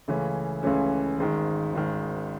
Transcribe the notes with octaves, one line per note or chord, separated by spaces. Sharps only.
C#2 C#3 E3 A3 C#4
C#2 C#3 E3 A3 C#4
G#1 G#2 D#3
G#1 G#2 D#3